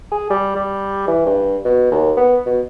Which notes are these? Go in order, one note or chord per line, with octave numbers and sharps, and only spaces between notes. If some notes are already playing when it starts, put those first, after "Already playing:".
G#4
G3
G3
E3
G2
B2
D#2
B3
B2